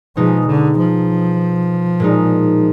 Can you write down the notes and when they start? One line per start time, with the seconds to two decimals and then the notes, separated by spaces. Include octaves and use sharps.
0.17 B2 F3 G#3 D#4
0.47 D3
0.77 F3
2.00 A#2 G#3 D#4